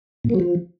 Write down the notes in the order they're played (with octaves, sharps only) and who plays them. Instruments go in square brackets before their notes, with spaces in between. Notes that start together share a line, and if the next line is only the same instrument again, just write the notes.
[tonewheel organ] A#2
A#3
F#3
F3